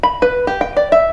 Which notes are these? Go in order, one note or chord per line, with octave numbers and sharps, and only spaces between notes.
B5
B4
G4
G5
D5
E5